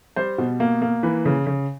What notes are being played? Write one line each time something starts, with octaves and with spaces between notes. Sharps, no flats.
G3 C5
B2
A#3
A#3
E3 B4
C#3
C#3